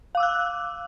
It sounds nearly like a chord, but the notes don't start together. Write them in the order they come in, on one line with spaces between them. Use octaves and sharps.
F5 D6 E6 F#6